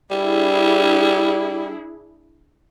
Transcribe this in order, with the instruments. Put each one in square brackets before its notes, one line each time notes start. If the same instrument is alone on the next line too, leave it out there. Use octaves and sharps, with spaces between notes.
[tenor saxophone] G3 [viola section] D4 E4 G#4